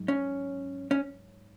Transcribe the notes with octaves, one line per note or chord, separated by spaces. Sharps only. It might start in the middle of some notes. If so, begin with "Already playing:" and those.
Already playing: G#2 F#3
C#4
C#4